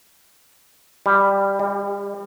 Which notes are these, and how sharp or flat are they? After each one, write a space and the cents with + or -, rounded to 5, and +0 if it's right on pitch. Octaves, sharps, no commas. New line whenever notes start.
G3 +10
G3 +40